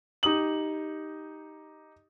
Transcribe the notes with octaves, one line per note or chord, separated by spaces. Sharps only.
D#4 G4 D#6 F#7